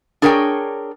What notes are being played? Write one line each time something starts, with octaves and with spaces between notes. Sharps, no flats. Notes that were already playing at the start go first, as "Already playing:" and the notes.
D4 G#4 A#4 C#5 F#5 G5